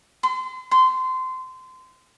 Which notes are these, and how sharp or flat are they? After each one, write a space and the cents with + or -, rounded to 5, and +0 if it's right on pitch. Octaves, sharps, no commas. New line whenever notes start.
C6 -35
C6 -20